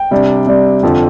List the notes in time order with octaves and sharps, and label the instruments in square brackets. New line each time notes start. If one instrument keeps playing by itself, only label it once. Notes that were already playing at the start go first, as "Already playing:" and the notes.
Already playing: [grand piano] G5
C3 G3 D4
C3 G3 D4
F2 D3 F3